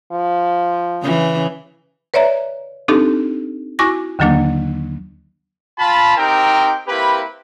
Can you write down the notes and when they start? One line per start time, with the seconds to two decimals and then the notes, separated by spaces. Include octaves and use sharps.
0.12 F3
1.02 C#3 E3
2.14 B4 C#5 D5 E5 A#5
2.88 C4 D4 D#4 G4 A4
3.79 E4 F#4 G#5 C#6 D6 A#6
4.19 D#2 D3 D#3 F#3 A#3 D4
5.79 F4 A5 B5
6.17 C4 D#4 G4 A#4 G5
6.88 A#3 C4 E4 G4 B4 B5